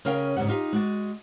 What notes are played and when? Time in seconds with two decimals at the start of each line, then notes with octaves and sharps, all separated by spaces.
0.05 C#3 C#4 A#4 F5 G5
0.36 G#2 C#3 F3 G3 F#5
0.48 D#4 F4 G4
0.73 G#3 F#4 D5